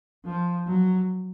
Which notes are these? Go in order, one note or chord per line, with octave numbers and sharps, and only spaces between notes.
F3
F#3